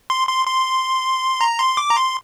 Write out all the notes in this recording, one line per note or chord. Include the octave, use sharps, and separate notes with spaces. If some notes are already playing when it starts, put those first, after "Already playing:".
C6
C6
C6
A#5
C6
D6
A#5
C6